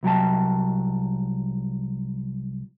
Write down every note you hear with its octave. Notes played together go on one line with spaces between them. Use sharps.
C2 F#3 G5 A5